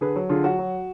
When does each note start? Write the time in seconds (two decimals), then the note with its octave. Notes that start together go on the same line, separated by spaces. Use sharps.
0.01 D3 G#4 B4
0.16 F#3
0.29 D3 F4 G#4
0.44 F#3 F#4
0.59 F#3